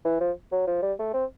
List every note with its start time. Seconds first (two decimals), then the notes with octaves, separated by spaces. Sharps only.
0.05 E3
0.21 F3
0.52 F#3
0.67 F3
0.82 G3
0.99 A3
1.14 C4